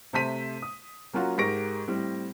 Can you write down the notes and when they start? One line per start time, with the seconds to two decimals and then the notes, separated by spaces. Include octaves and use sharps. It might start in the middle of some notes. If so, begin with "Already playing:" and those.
0.13 C3 A3 C5 A5 B6 D#7
0.62 D#6
1.13 F#3 A#3 C#4 F4 F#4
1.38 G#2 G4 A#4 C#6 A#6 D7
1.88 A2 G3 C4